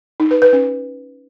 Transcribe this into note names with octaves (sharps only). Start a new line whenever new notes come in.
D#4
B4
B4
C#4